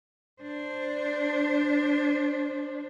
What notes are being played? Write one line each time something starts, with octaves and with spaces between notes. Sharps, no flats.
D4 C5